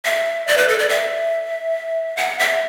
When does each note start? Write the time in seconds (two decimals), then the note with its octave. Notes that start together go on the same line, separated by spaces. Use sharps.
0.05 E5
0.48 D5
0.57 B4
0.68 A4
0.79 D5
0.89 E5
2.17 F#5
2.39 E5